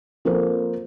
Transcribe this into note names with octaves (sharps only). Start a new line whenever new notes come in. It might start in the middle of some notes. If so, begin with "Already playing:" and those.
F3 A#3 C4 A4 C5